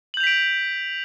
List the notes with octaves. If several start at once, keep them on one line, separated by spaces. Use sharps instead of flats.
G6 B6 D7 F7 F#7